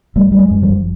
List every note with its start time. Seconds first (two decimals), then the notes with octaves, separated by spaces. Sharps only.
0.15 F#1 G3 A3
0.32 F#1 G3
0.39 F#3 G#3
0.51 F#2
0.62 F3 G3
0.69 F#1